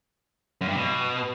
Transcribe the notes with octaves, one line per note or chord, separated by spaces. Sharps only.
F#2
G2
B2